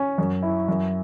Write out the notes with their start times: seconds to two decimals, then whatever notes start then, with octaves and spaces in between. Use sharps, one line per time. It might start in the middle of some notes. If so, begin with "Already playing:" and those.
Already playing: C#4
0.18 F#2
0.42 E4
0.68 F#2